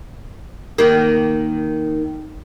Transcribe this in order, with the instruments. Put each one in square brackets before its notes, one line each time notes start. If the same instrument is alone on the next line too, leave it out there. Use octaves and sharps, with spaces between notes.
[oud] D#3 A#3